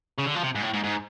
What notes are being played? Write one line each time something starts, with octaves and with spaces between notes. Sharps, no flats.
C#3
D3
F3
C3
G#2
A2
G#2
G#2